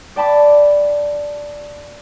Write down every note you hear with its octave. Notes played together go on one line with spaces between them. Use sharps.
D5 G5 A5 B5 D6